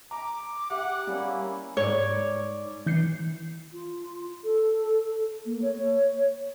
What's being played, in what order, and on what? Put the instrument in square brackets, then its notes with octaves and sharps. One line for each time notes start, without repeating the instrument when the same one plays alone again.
[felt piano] A#5 [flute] D6
[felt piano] G4 E5 [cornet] F#5
[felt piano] G3 [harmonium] A#3 C#4 E4
[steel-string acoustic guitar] G#2 D5 [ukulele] C#5
[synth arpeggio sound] E3 G6 C7 C#7
[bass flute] F4
A4
A#3
C#5